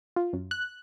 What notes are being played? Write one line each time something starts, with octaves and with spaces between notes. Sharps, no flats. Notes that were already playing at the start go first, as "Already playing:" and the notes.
F4
F#2
F#6